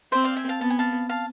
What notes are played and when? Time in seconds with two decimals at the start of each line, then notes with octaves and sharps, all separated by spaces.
0.12 C4 C5 E5
0.24 D5 F5
0.36 E5 G#5
0.49 F5 A5
0.61 B3 A5
0.70 G#5
0.79 F5 A5
1.09 F5 A5